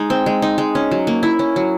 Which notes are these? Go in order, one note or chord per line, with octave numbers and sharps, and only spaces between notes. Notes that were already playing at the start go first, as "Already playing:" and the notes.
Already playing: G#3 D#4
C4
G#3
D#4
G#3
C#4
F#3
A#3
E4
C#4
F#3